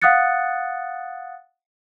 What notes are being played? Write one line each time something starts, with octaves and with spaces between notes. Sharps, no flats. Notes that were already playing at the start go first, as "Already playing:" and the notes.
F5 F#5 D#6 F#6 A6 C#7